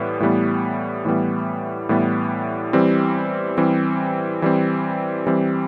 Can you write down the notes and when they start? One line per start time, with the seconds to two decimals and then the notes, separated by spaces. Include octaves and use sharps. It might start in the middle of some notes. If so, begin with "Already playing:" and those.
Already playing: A2 E3 G3 B3
0.20 A2 E3 G3 B3
1.05 A2 E3 G3 B3
1.89 A2 E3 G3 B3
2.73 E3 G3 C4
3.58 E3 G3 C4
4.42 E3 G3 C4
5.27 E3 G3 C4